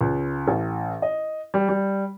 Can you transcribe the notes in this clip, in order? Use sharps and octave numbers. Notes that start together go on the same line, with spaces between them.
C#2
A1
D#5
G3
G3